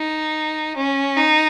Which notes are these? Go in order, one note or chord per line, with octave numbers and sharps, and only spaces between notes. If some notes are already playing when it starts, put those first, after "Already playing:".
Already playing: D#4
C#4
D#4